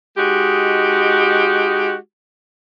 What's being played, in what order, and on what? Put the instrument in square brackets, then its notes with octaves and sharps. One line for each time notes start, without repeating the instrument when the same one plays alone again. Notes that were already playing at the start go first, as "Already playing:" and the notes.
[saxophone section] G#3 D#4 F#4 G4